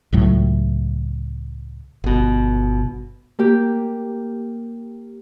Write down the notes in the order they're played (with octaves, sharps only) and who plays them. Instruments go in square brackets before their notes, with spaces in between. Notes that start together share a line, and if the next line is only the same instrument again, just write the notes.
[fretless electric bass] C#2 A2 F#3
[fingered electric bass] G1 B2
[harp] A#3 G4